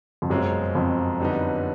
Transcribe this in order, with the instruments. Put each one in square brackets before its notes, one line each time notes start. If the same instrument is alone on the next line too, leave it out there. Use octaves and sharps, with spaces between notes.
[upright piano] F2
[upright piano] F#2 [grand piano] B2 G#3 C4 F4
[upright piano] F2
[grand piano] D3 G3 B3 D#4